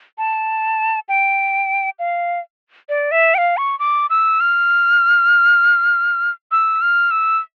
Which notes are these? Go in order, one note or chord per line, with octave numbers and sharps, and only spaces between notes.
A5
G5
F5
D5
E5
G5
F5
C#6
D6
E6
F6
E6
F6
E6